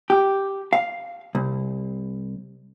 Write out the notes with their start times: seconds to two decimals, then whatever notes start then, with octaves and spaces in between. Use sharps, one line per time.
0.10 G4
0.73 F5
1.35 C2